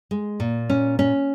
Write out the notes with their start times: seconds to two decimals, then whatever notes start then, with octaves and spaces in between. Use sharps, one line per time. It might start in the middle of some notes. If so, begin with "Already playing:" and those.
0.11 G#3
0.40 A#2
0.70 C#4
0.99 C#4